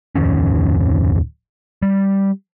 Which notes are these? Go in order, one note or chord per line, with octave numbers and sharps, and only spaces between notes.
D1 F2 D#3 C#4
G3